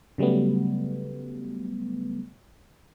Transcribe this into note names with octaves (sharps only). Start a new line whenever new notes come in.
C#3 F#3 G3 A3 B3